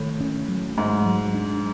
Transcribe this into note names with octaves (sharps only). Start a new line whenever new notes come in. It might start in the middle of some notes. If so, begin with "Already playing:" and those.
Already playing: A2 D#3
C#4
F#3
G#2 A3
F#3
D4